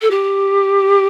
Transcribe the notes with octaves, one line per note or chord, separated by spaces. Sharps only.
A4
G4